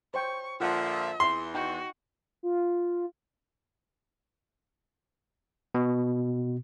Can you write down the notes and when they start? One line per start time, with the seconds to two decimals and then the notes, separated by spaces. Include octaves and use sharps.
0.14 C5 C#5 G5 C#6
0.60 A#2 D3 F3 F4 E5 F#5
1.20 E2 C6
1.54 D#4 F#4 G5
2.43 F4
5.75 B2